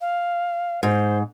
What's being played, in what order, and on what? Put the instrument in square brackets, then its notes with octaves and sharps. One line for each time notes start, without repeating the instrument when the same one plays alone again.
[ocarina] F5
[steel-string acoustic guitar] G#2 [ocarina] C5